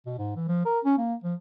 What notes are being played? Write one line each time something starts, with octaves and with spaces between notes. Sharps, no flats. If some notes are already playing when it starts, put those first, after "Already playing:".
B2
G#2
E3
F3
A#4
C#4
A#3
F3